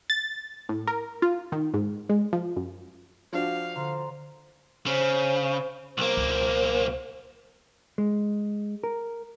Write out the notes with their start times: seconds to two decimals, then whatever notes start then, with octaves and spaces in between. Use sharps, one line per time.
0.10 A6
0.69 A2
0.87 A#4
1.22 F4
1.52 D#3
1.74 G#2
2.09 G#3
2.33 F3
2.56 F#2
3.33 F3 D4 F#4 F5
3.75 D3 C5 A#5 C6
4.86 C#3 C5
5.98 B1 A#3 C5
6.17 C#2
7.98 G#3
8.83 A#4